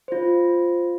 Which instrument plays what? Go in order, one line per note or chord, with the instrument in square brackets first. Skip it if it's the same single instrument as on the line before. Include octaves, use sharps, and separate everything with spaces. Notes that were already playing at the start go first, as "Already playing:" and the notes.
[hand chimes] F4 C5